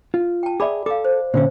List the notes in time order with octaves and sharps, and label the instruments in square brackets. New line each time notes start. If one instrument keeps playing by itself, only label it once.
[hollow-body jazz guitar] F4
[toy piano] G5 A5
[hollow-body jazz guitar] G#4 E5 [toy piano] D5 B5 D6
[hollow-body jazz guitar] A4 [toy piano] F5 D6
[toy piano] C5
[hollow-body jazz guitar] A#2 D3 C#4 [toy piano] C5 E5